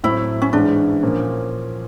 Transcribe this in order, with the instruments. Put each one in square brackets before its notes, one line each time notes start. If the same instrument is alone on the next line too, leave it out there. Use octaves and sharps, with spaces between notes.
[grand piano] A2 F#3 A3 C4 [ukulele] E4
[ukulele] C#4
[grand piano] G#2 E3 G#3 C#4 E4 [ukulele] D4
[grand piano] A#2 F3 A#3 C#4